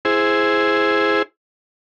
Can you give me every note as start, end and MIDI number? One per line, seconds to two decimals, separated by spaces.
0.05 1.22 64
0.05 1.22 68
0.05 1.22 72